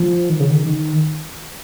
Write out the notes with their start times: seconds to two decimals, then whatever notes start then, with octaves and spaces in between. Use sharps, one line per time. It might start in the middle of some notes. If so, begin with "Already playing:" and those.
Already playing: F3
0.29 D#3
0.40 C#3
0.50 D#3
0.66 D#3